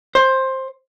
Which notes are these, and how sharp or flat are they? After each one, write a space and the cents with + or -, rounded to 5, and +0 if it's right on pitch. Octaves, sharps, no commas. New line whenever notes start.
C5 +15